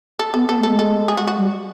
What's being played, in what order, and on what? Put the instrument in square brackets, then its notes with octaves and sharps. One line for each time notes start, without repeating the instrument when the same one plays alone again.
[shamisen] A4
[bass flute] B3 [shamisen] A4
[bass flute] B3 [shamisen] A4
[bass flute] A3
[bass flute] G#3 [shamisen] A4
[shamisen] A4
G#4
F#4
F#4
[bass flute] G3